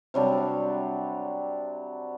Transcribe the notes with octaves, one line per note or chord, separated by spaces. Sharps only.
C3 F#3 G3 D4